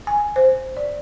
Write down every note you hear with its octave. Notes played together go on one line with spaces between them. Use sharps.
G#5
C5
D5